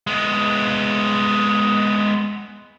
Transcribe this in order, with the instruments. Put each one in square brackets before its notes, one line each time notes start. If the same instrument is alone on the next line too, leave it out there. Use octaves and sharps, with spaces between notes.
[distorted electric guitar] G#3 B3